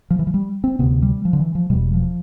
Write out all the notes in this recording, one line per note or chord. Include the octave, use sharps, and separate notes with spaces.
F3
E3
F3
G3
C4
D2 C3 B3
G3
F3
D3
E3
F3
E1 E2 B2 G3
F3